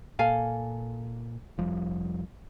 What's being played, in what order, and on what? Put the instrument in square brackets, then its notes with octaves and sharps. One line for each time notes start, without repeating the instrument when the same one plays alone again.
[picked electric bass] A#2 [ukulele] A4 F5 G#5
[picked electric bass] F1 F3 G3